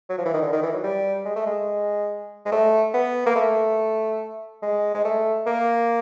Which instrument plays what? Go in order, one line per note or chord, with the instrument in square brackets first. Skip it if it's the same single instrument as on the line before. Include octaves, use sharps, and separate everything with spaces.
[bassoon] F#3
F3
E3
D#3
D3
D#3
E3
F#3
G3
G#3
A3
G#3
G#3
A3
B3
A#3
A3
G#3
G#3
A3
A#3